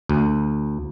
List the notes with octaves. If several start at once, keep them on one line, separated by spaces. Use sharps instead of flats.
D2